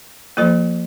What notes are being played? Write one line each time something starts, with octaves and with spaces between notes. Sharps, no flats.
F3 A#3 F4 A4 C5